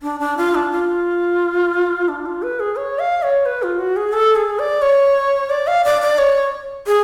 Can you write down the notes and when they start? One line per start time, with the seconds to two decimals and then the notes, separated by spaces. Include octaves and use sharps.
0.03 D4
0.20 D4
0.37 F4
0.55 D4
0.72 F4
2.08 D4
2.26 F4
2.43 B4
2.60 G#4
2.76 C#5
2.99 F5
3.23 C#5
3.46 B4
3.63 F4
3.79 F#4
3.96 G#4
4.13 A4
4.36 G#4
4.59 D5
4.82 C#5
5.50 D5
5.67 F5
5.85 D5
6.02 D5
6.18 C#5
6.87 G#4